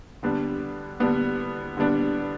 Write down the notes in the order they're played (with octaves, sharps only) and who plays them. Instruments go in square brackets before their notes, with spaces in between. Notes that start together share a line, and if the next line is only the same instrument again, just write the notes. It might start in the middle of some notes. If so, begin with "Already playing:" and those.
[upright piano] D3 G3 B3 D4
D3 G3 B3 D4
D3 G3 B3 D4